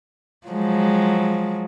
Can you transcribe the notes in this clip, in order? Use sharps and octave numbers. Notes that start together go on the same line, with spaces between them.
F3 F#3 G#3